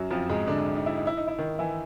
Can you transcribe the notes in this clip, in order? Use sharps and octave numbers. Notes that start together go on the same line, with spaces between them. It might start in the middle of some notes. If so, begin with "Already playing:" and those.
Already playing: F#2 F#3
F2 F3
G#2 G#3
D3 D4
D#4
E4
D#4
E4
D#4
E4
D#3 D#4
E3 E4